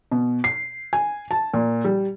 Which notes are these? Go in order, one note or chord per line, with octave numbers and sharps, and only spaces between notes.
B2
C7
G#5
A5
A#2
G3